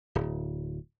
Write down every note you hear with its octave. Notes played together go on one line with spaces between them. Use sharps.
D1